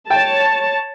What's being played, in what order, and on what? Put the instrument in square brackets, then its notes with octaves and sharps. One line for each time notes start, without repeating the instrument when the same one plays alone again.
[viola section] C#5 A5 [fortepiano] G5